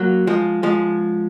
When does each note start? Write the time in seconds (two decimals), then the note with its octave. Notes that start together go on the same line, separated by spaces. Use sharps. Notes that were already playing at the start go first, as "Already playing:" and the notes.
Already playing: F#3 A#3
0.27 F3 G#3
0.63 F3 G#3